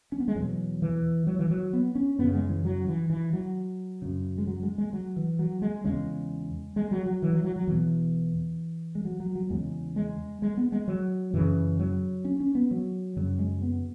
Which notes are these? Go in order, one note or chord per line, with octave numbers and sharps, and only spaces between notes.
C#4
B3
G#3
E2 B2 F#3
E3
F#3
E3
F#3
B3
C#4
F#2 C#3 B3
G#3
E3
F#3
E3
E3
F#3
F#2 C#3
G#3
F#3
G#3
G#3
F#3
E3
F#3
G#3
E2 C#3 G#3
G#3
F#3
F#3
E3
F#3
F#3
F#3
E2 B2 E3
G#3
F#3
F#3
F#3
E2 C#3 G#3
G#3
G#3
B3
G#3
F#3
F#2 C#3 E3
F#3
C#4
C#4
B3
F#3
F#2 C#3 F#3
G#3
B3